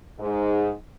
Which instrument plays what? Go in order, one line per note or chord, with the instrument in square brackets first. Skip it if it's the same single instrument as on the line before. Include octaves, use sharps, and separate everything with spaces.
[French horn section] G#2